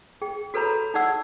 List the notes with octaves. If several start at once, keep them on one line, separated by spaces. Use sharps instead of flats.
G#4 G5
F#4 A4 B4 C#5 A#5 B5
D#4 G#4 D5 F#5 E6